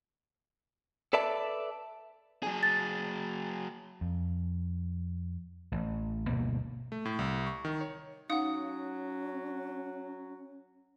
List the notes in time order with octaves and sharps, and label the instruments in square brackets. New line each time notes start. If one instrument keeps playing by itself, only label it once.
[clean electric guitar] A4 B4 D5 E5 A5
[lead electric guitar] F#3 G#4
[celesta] A6
[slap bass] F2
A1
G1 D2 B2 A#3
[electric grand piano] A3
A2
C2
C#6
D#3
C#5
[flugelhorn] F#3 [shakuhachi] C#4 [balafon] D#4 F5 [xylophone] F#5 D#6